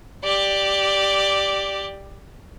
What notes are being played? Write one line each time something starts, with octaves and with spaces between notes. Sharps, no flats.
G4 D5